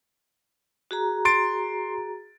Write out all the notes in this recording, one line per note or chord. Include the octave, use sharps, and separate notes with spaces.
F#4 G#4 A#5
C6 A6 D7